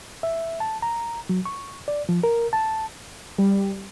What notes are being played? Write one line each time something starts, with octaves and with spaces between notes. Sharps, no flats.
E5
A5
A#5
F#3
C#6
D5
F3
A#4
A5
G3